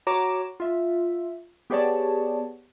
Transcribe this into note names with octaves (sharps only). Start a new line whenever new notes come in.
F#4 C#5 A#5 D6 E7
F4 E5
B3 G4 G#4 C#5 D5 A5